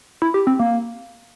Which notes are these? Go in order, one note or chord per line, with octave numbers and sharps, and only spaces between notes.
E4
G4
C4
A#3